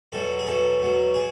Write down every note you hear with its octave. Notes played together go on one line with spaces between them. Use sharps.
E2 B2 F#3 A4
G#4
E2 B2 F#3 A4
E2 B2 F#3
B2 G#4